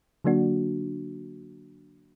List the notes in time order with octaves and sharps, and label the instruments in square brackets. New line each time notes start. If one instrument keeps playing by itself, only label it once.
[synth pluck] D3 F#3 A#3 D4 F#4